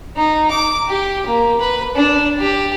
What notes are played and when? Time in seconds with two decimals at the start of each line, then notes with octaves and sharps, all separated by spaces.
0.17 D#4
0.50 D6
0.89 G4
1.26 A#3
1.61 B4
1.96 D4
2.39 G4